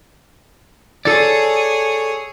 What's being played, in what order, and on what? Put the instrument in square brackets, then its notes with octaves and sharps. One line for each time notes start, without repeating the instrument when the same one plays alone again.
[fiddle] G#4 C#5 [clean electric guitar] A4 D5